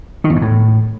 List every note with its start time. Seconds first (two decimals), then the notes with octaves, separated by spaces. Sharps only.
0.24 D#3
0.30 E2
0.36 G#2
0.42 A2